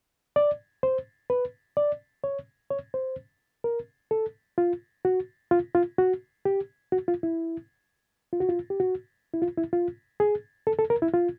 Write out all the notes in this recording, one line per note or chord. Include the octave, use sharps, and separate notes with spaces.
D5
C5
B4
D5
C#5
C#5
C5
A#4
A4
F4
F#4
F4
F4
F#4
G4
F#4
F4
E4
F4
F#4
F4
G4
F#4
E4
F4
E4
F4
G#4
A4
A4
A#4
E4
F4